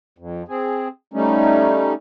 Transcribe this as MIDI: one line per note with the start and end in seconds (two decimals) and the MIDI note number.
0.18 0.43 41
0.48 0.88 60
0.48 0.88 68
1.13 1.93 55
1.13 1.93 57
1.13 1.93 61
1.13 1.93 63